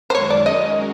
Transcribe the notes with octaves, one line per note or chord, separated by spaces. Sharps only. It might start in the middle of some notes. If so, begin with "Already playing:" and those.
C5
F#2 D#3 G#3 C#5
D5
G#3 C#4 F#4 A#4 D#5